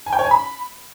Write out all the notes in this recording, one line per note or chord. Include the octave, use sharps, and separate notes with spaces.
G#5
G5
C#5
G#5
B5